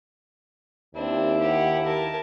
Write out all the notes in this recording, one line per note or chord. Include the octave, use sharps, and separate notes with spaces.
D#2 C4 D4 E4
G4 F#5
A#4 A5